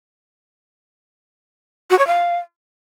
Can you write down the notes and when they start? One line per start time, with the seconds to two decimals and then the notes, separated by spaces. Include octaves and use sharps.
1.90 F#4
1.99 C#5
2.07 F5